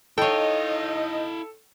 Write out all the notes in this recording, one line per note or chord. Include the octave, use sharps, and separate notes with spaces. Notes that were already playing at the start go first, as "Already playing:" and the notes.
D#4 E4 A4 C#5 D#5 F5 G5